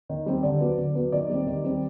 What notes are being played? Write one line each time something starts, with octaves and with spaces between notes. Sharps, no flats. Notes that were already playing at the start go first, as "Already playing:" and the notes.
D#3
G3 C4
D3 D5
F#3 B3
D3
F#3 B3
D#3 D5
G3 C4
D#3
G3 C4